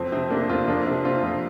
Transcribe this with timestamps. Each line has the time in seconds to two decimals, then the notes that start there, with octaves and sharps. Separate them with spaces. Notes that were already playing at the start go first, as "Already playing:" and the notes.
Already playing: F2 C4
0.12 C3 C4
0.30 C3 A#3 D4
0.49 F2 C4 F4
0.68 F2 A#3 D4
0.86 C3
1.05 C3 C4 F4
1.23 F2